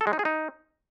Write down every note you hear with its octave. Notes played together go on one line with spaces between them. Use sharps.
A4
G#3
D#4
G#4
D#4